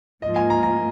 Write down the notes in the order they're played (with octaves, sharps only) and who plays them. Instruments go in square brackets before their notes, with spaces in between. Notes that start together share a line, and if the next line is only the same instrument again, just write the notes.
[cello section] G#2 F3 A#3 F4 [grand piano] D#5
[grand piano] G#5
A#5
A#5